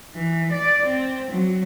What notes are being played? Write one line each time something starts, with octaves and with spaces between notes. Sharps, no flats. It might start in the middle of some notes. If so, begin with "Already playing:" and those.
E3
D5
C4
F#3